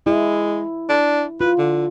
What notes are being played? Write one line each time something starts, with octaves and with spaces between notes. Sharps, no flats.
G#3 E4
D4
F4 B4
D3